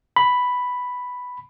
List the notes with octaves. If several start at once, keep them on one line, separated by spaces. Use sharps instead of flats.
B5